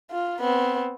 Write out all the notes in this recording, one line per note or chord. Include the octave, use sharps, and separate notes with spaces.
F4
B3 C4